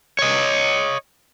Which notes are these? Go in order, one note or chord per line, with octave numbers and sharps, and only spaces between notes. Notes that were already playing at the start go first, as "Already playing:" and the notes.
C#5 D#5